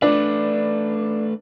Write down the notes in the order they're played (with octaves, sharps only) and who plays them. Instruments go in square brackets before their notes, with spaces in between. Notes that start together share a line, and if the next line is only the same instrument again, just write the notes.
[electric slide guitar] A3 B4 [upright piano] D4